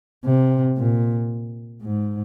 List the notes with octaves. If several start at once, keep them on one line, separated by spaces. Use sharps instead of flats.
C3
A#2
G#2